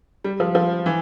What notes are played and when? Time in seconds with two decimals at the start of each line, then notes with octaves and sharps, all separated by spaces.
0.24 G3
0.40 F3
0.55 F3
0.86 E3